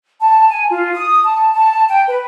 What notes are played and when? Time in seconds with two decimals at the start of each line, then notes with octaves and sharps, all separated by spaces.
0.20 A5
0.50 G#5
0.70 F4
0.94 D#6
1.23 A5
1.53 A5
1.89 G5
2.08 B4